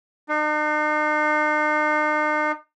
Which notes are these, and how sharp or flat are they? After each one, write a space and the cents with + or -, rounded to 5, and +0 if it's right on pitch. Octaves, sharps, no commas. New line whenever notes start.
D#4 -45